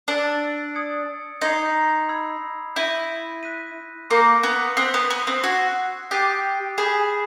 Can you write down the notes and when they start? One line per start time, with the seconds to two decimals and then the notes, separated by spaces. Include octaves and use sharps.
0.08 D4 E6 A6 D7 F#7
0.75 D#6 G#6 C#7
1.41 D#4 C6 D#6 G#6 C7 F7
2.09 B5 E6 G#6
2.76 E4 G6 A#6 D#7
3.43 F#6 B6 D#7
4.10 A#3 C6 E6 G6 A#6 C#7
4.43 B3
4.77 C4 C6 D#6 F#6 B6
4.94 B3
5.10 B3
5.27 C4
5.44 F#4 C#6 E6 G#6 C7
6.11 G4 D#6 F#6 A6 C7 D#7
6.78 G#4 B5 D#6 G6 B6 E7